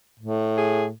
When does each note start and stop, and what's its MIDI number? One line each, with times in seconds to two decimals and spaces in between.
0.20 0.92 45
0.58 0.86 68